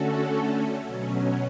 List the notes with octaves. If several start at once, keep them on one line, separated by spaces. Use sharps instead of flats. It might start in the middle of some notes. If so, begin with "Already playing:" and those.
Already playing: D3 A3 C#4 F#4 A4
B2 F#3 C#4